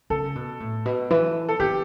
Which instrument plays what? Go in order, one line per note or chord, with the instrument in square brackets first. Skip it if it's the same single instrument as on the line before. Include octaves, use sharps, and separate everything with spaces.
[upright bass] C#3 [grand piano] A4
[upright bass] B2
A2
B2
E3
[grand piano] A4
[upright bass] E3 [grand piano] G4